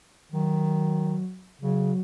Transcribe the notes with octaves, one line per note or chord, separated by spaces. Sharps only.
D#3 F#3
C#3 F#3